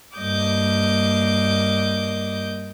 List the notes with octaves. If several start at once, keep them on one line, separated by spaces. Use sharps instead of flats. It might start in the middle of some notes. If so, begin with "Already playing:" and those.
G2 A#3 D#5 D6 G6